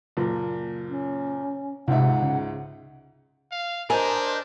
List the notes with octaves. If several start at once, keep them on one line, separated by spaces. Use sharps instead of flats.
F#1 A#2
C#4
C#2 G#2 C3 E5 F#5
C#3
F5
D4 A#4 C5 D#5 G#5